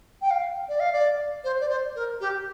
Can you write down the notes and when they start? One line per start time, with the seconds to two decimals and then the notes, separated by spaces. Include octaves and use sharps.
0.22 G5
0.31 F5
0.69 D5
0.80 F5
0.93 D5
1.44 C5
1.61 D5
1.69 C5
1.95 A#4
2.21 G4